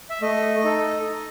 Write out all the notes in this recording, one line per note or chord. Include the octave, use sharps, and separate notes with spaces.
E5
A3 D#5
D#4 A4
D#4